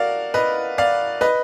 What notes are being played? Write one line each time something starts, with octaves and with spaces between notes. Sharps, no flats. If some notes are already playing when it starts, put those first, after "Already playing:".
Already playing: F#4 A#4 D5 F5
B4 D#5
D5 F5
B4 D#5